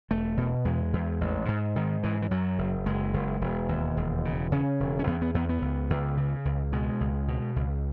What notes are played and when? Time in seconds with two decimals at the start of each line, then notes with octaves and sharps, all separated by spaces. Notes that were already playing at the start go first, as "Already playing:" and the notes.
0.11 E1 A3
0.37 B2
0.65 E2 G#3
0.93 E2
1.21 A1
1.48 G#2
1.76 G#2 D#3
2.03 G#2 E3
2.22 E3
2.31 F#2 F#3
2.58 F#1
2.86 F#1 G#3
3.14 F#1
3.41 E1
3.69 D#2
3.97 E1
4.25 C#3
4.52 C#3 C#4
4.80 E1
4.99 C#4
5.07 E2 B3
5.22 B3
5.34 E2 B3
5.49 B3
5.62 C#2
5.90 C#2
6.17 C#3
6.45 C#2
6.72 B2 G#3
7.00 C#2
7.28 B2
7.56 C#2